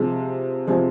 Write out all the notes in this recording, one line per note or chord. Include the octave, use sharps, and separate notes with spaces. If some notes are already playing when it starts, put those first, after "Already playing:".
Already playing: C3 F3 G#3
C3 F3 G#3